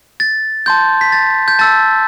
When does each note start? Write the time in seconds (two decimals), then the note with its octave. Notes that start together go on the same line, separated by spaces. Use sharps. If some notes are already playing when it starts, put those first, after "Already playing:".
0.20 A6
0.66 A5 C6 G6
1.01 B6
1.12 A6
1.48 G6
1.59 A5 E6 G6 A6